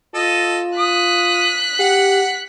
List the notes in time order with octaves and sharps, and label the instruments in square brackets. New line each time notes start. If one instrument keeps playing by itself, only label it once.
[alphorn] F4 [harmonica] A4 D#5
[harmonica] D#6 [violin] F#6 B6
[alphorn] G4 [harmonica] F#5